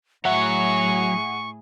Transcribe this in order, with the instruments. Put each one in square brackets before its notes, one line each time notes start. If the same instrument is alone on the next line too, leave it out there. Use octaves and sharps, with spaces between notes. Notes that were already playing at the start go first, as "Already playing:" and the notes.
[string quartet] A2 G#4 [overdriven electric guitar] F#3 C#5 [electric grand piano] E5 F#5 [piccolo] C#6